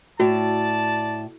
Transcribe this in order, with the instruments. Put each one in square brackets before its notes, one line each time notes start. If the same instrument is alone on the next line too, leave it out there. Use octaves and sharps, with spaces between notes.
[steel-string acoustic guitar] A2 [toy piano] F#4 [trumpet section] D5 A5